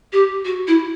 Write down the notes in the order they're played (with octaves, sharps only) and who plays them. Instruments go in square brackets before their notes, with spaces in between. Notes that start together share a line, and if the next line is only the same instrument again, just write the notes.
[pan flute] G4
F#4
E4